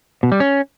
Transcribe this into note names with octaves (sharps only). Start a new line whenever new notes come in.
B2
G3
C#4